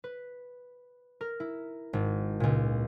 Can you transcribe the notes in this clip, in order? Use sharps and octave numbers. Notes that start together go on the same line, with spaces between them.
B4
A#4
E4
G#1
C#2 A#2